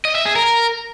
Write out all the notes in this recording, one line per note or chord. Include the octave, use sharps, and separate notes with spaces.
D#5
E5
G#4
A#4